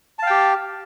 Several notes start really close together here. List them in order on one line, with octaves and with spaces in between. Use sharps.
A5 F5 G5 G4